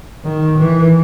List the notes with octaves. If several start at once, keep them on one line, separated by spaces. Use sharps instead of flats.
D#3
E3